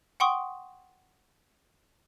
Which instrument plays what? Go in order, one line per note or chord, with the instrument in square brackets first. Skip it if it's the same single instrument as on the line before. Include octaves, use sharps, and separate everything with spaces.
[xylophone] F#5 G5 C6 C#6 D#6